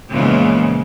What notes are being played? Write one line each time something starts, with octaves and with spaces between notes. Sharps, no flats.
A#2 C#3 E3 F3 G#3 B3